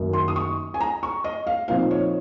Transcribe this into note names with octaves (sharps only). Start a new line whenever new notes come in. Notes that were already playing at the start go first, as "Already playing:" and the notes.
Already playing: F#2 D#3 A#3
C6
D#6
C#6
G#5
A#5
C#6
D#5
F5
A#2 F3 C4 D#4 F5
C#5